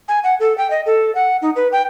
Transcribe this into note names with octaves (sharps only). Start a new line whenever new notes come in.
G#5
F#5
A4
G5
D#5
A4
F#5
D#4
B4
G5